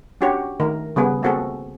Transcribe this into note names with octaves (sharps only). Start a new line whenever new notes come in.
C#4 D4 F#4 G4 C#5
D#3 A3 A#4
C#3 G3 B3 G#4
A3 A#3 C4 F#4 G#4 A4